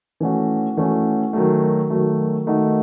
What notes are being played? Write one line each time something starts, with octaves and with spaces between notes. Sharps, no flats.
E3 A3 C#4 F#4
E3 A3 C#4 F#4
D#3 F#3 A3
D#3 F#3 A3
D#3 A3 D#4 F#4